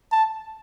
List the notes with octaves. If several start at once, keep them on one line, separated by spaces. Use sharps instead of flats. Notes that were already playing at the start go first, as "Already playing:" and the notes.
A5